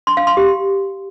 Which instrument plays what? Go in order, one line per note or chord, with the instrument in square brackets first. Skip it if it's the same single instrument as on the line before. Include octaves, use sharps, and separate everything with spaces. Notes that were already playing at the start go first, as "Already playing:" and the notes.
[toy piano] C6
F5
C6
G4